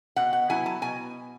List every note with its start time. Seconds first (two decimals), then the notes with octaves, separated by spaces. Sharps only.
0.16 B2 F#5
0.33 F#5
0.49 F#3 B3 E4 G#5
0.66 A5
0.82 B2 G#5